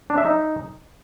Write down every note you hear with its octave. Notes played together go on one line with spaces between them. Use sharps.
D4
E5
D#4